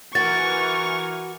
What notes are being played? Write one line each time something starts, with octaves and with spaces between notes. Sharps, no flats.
E3 F#4 A#4 G#5 C#6 A6